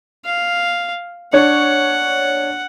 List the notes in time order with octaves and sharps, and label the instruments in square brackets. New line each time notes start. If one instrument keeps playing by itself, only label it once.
[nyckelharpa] F5
[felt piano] D4 C#5 C#6 [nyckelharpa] F#5